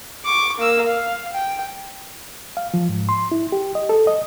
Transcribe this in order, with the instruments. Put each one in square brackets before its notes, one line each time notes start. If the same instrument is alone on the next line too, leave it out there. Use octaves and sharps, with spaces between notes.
[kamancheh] C#6 D6
A#3 E6
F5
G5
[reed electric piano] F5
F3
G#2
C6
E4
G4
D#5
A4
D#5